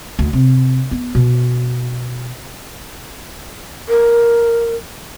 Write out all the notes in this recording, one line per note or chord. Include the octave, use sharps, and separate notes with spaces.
D2
C3
B3
B2
A#4